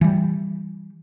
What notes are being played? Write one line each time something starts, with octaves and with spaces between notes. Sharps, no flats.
E3 G3